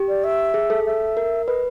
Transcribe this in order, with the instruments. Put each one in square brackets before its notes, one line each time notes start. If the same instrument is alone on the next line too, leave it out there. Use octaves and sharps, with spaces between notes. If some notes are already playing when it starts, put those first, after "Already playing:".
Already playing: [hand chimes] G4
[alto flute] D5
E5
[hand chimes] G#4
A4
[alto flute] E5
[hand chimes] A#4
[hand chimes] B4 [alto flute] D#5